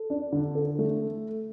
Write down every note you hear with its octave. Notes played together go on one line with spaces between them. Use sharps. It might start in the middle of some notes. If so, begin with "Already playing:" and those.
Already playing: A4
D4
D3
A4
A3